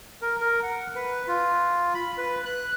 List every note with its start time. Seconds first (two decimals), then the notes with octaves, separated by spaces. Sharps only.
0.22 A#4
0.40 A#4
0.63 F#5
0.95 B4
1.27 F4
1.94 B5
2.18 B4
2.46 F#6